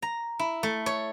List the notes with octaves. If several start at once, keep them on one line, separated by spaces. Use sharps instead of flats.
A#5
E4
A3
C#5